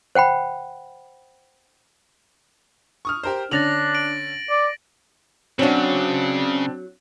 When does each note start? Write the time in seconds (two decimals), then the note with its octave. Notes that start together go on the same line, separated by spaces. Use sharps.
0.15 C5 F#5 G5 B5
3.05 C#6 D#6 F6
3.23 G4 A#4 C5
3.51 D3 C#4 D4 A6 A#6 F7 F#7
3.95 D7 F#7
4.50 D5
5.59 C#3 F#3 C4 D4 F#4